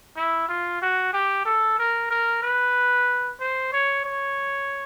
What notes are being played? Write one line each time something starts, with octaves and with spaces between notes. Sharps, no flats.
E4
F4
F#4
G4
A4
A#4
A#4
B4
C5
C#5
C#5